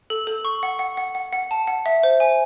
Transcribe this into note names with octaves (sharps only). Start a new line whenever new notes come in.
A4
A4
C#6
F#5
F#5
F#5
F#5
F#5
A5
F#5
E5
C5
G#5